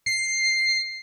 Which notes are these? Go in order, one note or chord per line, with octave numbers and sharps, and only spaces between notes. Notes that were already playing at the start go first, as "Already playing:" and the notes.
C7